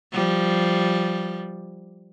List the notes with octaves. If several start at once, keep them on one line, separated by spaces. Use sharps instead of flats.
F3 G3